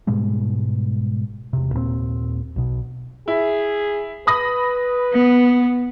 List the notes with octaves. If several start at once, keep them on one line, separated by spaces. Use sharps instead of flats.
G#2 B2 G3 G#3
E1 C3
D#2 A#2 G3 C4
B1 B2
E4 G#4
B4 B5 D#6 A#6
B3